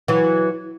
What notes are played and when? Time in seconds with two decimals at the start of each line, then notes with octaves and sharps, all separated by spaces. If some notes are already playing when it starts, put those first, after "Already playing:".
0.08 E3 F#3